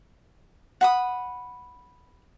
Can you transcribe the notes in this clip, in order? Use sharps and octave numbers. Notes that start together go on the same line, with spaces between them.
F#5 B5 D#6